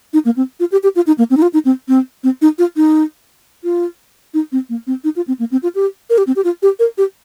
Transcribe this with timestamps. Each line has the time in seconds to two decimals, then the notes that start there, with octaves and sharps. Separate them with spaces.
0.13 D#4
0.25 A#3
0.37 C4
0.60 F4
0.72 G4
0.83 G4
0.96 F4
1.07 D#4
1.18 A#3
1.30 C4
1.37 D#4
1.42 F4
1.54 D#4
1.65 C4
1.88 C4
2.24 C4
2.42 D#4
2.59 F4
2.77 D#4
3.64 F4
4.34 D#4
4.52 C4
4.69 A#3
4.87 C4
5.04 D#4
5.16 F4
5.28 C4
5.39 A#3
5.52 C4
5.63 F4
5.75 G4
6.10 A#4
6.18 G4
6.27 C4
6.36 G4
6.44 F4
6.62 G4
6.79 A#4
6.98 G4